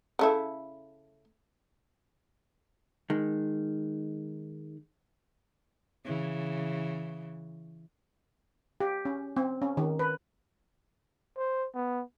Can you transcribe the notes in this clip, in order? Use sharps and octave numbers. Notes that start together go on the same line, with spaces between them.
C#3 A3 E4
D#3 G#3
C#3 E3
G4
C#4
C4
C#4
D#3
B4
C5
B3